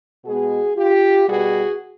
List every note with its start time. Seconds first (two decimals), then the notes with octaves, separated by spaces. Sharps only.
0.24 B2 G#3 B3 F#4 G#4
0.76 F4 G4
1.28 B2 G3 B3 F#4 G#4